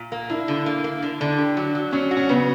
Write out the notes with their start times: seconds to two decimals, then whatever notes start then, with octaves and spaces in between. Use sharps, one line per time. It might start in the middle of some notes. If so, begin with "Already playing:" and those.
Already playing: A#2
0.12 A#3
0.29 D4 E4
0.48 D3
0.66 A#3
0.84 A#3
1.03 D3
1.20 D3 D4
1.38 G4
1.57 F#3
1.75 F#3
1.92 F#3 C#4
2.11 F#4
2.17 C#4
2.29 C#3 B3